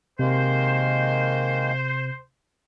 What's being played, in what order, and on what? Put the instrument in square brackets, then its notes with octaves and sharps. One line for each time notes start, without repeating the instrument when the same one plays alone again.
[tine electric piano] C3 [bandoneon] D#3 G#3 A#3 [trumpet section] C5